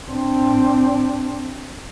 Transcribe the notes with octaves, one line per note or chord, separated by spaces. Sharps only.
C4 D4